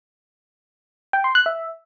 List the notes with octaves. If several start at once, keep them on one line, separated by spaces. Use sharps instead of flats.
G5
C6
F#6
E5